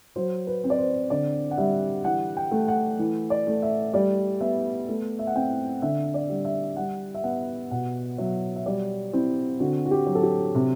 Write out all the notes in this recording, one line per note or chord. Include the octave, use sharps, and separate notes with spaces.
F#3 C5
B4
C4
D5
C5
D3 D5
F#5
G3 E5
E3 F#5
G5
A3
F#5
E3
D5
A3
E5
G3 D5
B3 E5
A3
E5
F#5
C4 G5
D3 E5
D5
G3
E5
G3 F#5
E5
B3 F#5
B2 F#5
F#3 E5
E5
G3 D5
C4 E4
D3 F#4
F#4
G4
F#3
A4
G4
C3